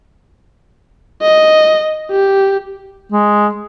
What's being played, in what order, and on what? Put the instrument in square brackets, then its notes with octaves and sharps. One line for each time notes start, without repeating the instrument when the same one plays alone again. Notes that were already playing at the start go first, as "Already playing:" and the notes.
[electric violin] D#5
G4
[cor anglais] G#3